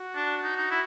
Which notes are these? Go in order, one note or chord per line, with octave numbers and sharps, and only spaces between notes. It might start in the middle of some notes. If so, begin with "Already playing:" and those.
Already playing: F#4
D4
D#4
D#4
E4